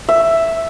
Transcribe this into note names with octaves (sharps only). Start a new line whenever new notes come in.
E5